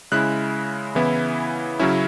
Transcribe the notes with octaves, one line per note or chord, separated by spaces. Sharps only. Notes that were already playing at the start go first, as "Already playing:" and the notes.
C#3 G#3 E4 F#6
C#3 E3 B3 E4
C#3 F#3 C#4 E4